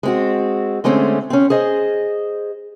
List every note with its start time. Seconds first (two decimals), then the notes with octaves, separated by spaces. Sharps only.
0.03 G#3 C4 F#4
0.84 D3 G#3 A3 C4 C#4
1.30 C4 C#4
1.50 G#4 C5 D#5